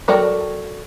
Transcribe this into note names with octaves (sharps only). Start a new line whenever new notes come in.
F#3 A4 A#4 D5 G5